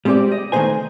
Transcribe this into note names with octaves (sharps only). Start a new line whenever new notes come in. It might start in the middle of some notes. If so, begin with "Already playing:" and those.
G3 G#3 C4 F#4 G4 D5
D#5
D#3 A3 D4 D#4 C5 G#5